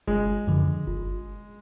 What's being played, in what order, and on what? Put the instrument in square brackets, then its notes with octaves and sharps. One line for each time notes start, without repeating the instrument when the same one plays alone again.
[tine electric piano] G1 [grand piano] G#3
[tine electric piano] F#2 D3 F3
G1